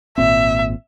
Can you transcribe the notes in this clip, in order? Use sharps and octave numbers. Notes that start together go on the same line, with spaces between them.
G#1 A#2 C4 E5